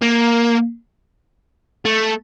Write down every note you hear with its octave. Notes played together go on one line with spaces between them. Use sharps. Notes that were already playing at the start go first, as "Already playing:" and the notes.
A#3
A3